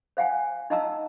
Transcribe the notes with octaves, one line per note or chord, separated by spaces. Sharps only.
C5 F5 F#5 G#5
D#4 D#5 F5 A5 A#5 E6